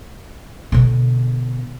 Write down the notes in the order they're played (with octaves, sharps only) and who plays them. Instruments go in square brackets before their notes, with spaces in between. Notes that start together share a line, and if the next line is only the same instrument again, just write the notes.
[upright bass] B2 D3